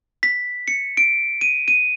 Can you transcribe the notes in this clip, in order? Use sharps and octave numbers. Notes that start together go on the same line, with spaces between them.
B6
C#7
D7
D#7
D#7